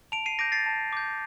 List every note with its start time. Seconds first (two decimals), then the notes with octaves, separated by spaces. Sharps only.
0.12 A5 D7 F7
0.26 C7 D#7
0.39 D6 G6 A#6 D7
0.52 A6 C7
0.66 A5
0.93 D6 G6